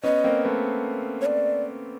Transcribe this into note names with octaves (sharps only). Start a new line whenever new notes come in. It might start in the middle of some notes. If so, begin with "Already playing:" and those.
B3 C#4 D#5
A#3 C4
A3 B3
C#5
D5